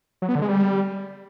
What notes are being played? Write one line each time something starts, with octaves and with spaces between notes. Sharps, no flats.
F#3
B3
D3
G#3
G3